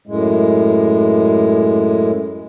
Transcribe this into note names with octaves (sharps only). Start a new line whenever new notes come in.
F#2 A2 G#3